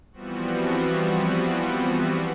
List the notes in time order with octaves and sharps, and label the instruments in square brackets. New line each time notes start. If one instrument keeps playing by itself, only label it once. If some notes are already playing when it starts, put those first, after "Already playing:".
[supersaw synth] E3 F3 G3 B3 C4 F#4